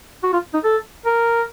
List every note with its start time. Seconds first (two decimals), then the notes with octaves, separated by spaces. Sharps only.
0.23 F#4
0.33 F4
0.54 D#4
0.64 A4
1.06 A#4